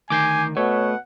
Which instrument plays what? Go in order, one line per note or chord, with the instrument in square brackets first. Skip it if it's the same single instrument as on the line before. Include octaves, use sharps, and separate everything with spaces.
[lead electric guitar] D2 D#3 [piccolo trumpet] G#5 [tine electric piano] D6 G6 C7
[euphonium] B2 [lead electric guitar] A3 [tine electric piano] C#5 [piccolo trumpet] F#5